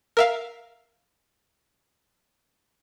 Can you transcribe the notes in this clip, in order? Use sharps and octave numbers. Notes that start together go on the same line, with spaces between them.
A#4 E5 F5